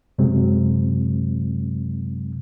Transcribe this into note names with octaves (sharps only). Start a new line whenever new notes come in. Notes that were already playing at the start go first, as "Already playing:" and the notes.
F#2 C3 F#3 G#3 C4